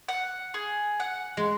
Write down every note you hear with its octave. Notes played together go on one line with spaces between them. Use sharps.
F#5
G#4
F#5
G#3